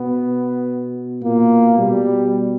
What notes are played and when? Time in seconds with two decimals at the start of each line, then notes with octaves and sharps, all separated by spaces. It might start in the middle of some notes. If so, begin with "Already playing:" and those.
Already playing: B2 B3
1.23 A#2 A#3
1.79 B2 G3